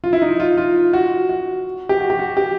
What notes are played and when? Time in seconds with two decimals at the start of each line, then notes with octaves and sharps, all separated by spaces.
0.04 F4
0.13 E4
0.22 D#4
0.40 F4
0.58 F4
0.93 F#4
1.29 F#4
1.89 G4
2.00 F#4
2.10 G4
2.19 F#4
2.37 G4